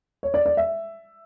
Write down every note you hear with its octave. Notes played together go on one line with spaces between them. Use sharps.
C#5
D5
D5
E5